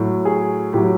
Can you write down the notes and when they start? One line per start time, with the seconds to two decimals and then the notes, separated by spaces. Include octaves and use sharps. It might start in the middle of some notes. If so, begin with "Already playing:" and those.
Already playing: A2 F#3
0.25 G#4
0.73 A2 F#3 G4